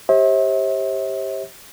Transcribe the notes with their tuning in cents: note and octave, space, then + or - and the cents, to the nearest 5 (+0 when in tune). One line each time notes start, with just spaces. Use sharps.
G4 +0 C5 +45 E5 -40